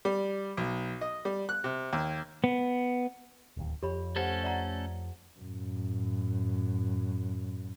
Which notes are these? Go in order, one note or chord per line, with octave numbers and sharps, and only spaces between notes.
G3
B1
D#5
G3
F#6
C3
D#2
B3
D1 D#2
F2 G4 C#5 B5
A3 C#4 G4 A4 C5 F#5
D5 F#5 A#5
F#2 A2